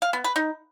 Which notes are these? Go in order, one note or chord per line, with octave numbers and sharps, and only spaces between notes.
F5
B3
B4
D#4